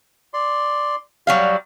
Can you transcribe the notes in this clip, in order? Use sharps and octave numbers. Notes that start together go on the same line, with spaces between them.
D5 C6
F#3 G3 F#4 F5